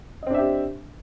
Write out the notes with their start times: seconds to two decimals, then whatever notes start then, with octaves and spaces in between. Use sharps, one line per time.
0.23 D#5
0.27 C4
0.31 D4
0.35 E5
0.38 G4